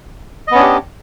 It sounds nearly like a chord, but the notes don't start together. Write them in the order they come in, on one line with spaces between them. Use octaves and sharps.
D#5 B3 C#4 D4 G4